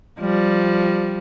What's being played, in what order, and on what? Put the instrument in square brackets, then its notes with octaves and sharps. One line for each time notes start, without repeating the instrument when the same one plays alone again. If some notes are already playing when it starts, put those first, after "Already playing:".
[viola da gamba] F3 G3